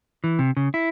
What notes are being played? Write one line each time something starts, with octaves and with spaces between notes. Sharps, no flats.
E3
C3
C#3
E4